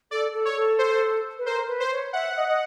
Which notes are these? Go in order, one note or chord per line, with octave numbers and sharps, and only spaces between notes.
A4 D5
A4
C#5
A4
C5
B4
A#4 C5
B4
C5
C#5
E5 F#5
D#5
D#5